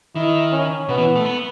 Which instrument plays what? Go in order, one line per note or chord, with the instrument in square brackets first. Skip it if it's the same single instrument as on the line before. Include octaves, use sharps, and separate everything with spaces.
[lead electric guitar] D#3 [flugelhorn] E4
[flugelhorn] C#4
[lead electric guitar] B2 [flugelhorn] B3
[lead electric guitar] E3
A3
B3